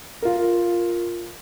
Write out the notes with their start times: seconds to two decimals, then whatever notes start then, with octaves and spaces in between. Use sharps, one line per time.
0.22 F4 A#4